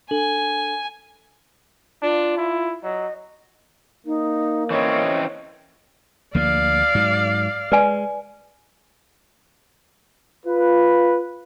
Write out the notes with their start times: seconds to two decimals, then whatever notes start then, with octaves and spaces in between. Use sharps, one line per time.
0.11 D4 A4 G#5 F#7
2.03 D4 F4
2.37 E4
2.84 F#3 D#5
4.06 A#3 D#4
4.70 E3 C4 C#4 C#5 D#5
6.35 D2 F3 A#3 D5 F5
6.95 G#2 F#3
7.72 G#3 B4 D5 G#5
10.46 F4 B4